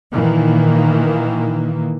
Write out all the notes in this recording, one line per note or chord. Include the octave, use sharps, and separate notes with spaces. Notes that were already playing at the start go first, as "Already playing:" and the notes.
A#2 D#3 E3 A#3